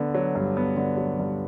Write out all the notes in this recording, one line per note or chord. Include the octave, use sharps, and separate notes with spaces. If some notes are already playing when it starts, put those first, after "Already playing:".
Already playing: D3 B3
F#3
G2
B3
D3
F#3
G2